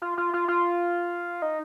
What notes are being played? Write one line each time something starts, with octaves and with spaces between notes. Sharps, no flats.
F4
F4
F4
F4
D#4